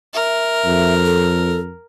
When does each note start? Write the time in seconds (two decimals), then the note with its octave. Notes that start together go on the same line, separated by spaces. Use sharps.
0.14 A#4 E5
0.66 F2
1.05 A4